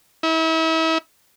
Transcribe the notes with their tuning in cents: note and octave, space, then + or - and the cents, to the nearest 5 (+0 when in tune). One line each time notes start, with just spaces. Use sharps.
E4 -35